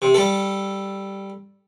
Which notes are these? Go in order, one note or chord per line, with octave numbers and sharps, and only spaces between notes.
C3
G3 A4